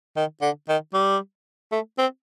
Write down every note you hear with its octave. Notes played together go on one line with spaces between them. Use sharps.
D#3
D3
D#3
G3
A3
C4